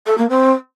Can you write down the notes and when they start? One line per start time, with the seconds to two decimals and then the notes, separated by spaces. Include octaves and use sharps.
0.06 A4
0.18 A#3
0.30 C4